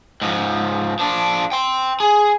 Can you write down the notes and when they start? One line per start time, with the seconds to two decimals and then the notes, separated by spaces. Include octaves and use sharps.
0.21 G#2 F3
0.99 F3 D4
1.52 G5 C6
2.00 G#4